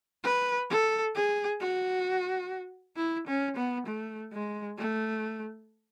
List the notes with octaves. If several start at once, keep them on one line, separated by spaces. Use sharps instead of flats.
B4
A4
G#4
F#4
E4
C#4
B3
A3
G#3
A3